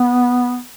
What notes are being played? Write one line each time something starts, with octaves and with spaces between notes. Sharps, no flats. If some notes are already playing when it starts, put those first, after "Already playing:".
Already playing: B3